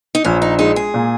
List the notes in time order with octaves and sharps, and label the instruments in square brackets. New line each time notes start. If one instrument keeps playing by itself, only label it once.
[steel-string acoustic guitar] D#4
[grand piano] A#1 [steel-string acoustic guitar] C#4
[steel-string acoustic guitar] D#4
[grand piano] G#3 [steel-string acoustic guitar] D#4
[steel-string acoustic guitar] G#4
[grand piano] A#2